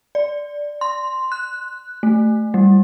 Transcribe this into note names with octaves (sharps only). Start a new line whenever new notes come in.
D5
C6
F#6
A3
G3